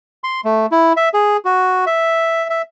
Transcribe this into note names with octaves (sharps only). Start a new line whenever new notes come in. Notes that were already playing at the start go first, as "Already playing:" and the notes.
C6
A3
E4
E5
G#4
F#4
E5
E5